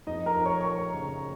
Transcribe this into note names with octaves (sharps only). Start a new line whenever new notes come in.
F2 D#4 D#5
A#4 A#5
F2
C#5 C#6
C#6
F3 A#4 A#5
C#3